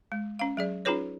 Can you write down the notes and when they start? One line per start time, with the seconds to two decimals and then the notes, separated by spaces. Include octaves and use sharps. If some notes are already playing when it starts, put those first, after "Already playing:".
0.12 G#3
0.39 C#4 F5
0.57 F#3 G#4 D5
0.85 C#4 D#4 F4 G#4 B4 C#5